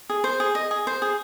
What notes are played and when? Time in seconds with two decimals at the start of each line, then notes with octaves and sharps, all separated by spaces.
0.09 G#4
0.24 C5
0.40 G#4
0.55 D#5
0.71 G#4
0.87 C5
1.02 G#4